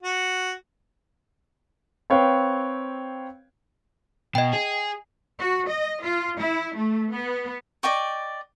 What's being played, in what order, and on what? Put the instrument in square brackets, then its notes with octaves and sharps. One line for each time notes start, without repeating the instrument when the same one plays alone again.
[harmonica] F#4
[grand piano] C4 B4 C#5 F5 G5
[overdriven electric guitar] B2 [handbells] D#5 G5
[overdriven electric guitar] G#4
[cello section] F#4
D#5
F4
E4
A3
B3
[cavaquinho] D5 D#5 G5 C#6